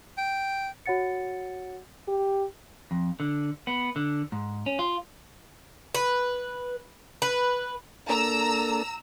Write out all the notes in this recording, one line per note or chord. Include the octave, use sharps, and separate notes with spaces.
G5
F#4 C#5 F#5 A6 C#7
G4
F2
D3
B3
D3
G#2
C#4
F4
B4
B4
A#3 D4 A4 A#5 E6